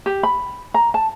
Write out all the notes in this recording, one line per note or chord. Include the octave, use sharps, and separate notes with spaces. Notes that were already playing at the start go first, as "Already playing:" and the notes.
G4
B5
A#5
A5